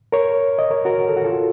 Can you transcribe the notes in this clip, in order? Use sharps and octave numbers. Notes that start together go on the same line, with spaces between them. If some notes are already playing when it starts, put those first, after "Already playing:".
A#4 C#5
D#5
A#4 C#5
F#4 A#4
A#4
A4
F#4
F4 A4